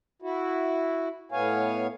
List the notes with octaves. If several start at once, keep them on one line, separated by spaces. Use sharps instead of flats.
E4 F#4
A2 B3 C#5 F5 G#5